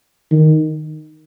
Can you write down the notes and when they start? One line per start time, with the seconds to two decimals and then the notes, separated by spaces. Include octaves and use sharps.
0.31 D#3